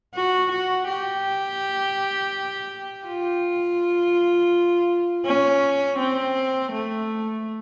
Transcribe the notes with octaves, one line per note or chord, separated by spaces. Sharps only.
F#4
F#4
G4
F4
C#4
C4
A3